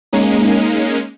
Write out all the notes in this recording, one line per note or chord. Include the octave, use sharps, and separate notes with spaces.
G#3 A#3 C#4 D#4